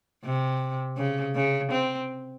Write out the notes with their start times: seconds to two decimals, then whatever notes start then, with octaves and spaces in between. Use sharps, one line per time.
0.24 C3
0.97 C#3
1.35 C#3
1.71 C4